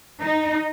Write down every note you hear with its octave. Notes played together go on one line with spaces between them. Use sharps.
D#4